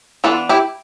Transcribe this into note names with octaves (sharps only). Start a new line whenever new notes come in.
E3 B3 D4 F4 A4
E4 G4